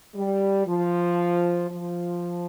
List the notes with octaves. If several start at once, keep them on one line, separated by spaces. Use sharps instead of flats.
G3
F3
F3